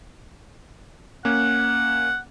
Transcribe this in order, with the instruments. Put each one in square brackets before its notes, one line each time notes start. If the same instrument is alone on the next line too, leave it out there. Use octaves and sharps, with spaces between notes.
[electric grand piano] A#3 C#4 [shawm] F#5